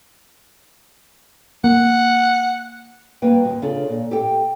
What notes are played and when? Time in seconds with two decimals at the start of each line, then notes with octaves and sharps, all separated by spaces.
1.64 A#3 F#5
3.22 G3 A#3 B4 G5
3.45 D#2 B2
3.62 C#3 D4 F4 A4
3.89 A#2
4.11 G4 A4 G5